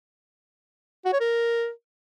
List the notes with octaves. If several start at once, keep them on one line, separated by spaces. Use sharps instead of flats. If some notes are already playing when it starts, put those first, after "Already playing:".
F#4
C#5
A#4